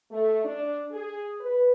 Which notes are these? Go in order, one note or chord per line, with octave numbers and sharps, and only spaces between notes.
A3
D4
G#4
B4